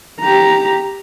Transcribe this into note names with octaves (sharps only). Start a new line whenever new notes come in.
G4 A#5